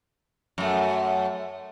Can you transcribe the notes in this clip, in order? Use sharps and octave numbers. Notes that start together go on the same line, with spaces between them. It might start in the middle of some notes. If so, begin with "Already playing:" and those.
F#2 A3